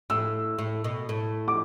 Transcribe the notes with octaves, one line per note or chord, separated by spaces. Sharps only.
A2 E6
A2
B2
A2
D6